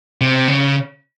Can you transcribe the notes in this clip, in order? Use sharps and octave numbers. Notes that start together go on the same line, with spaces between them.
C3
C#3